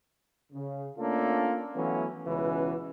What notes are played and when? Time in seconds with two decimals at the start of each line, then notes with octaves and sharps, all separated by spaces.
0.53 C#3
0.97 A3 A#3 C#4 D4 F4 A4
1.75 E3 F#3 A3 B3 C#4 E4
2.26 C#2 B2 E3 C#4 B4